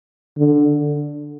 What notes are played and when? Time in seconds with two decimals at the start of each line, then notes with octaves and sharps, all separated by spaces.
0.38 D3